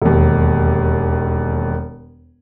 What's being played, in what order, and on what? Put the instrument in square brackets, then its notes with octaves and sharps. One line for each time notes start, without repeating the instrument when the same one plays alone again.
[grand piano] E1 D#2